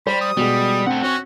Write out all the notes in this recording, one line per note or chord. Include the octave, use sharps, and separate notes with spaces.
G3 C5 B5
D#6
B2 G3 G#3
A3 C4 F#5
C#4 F#4 C#5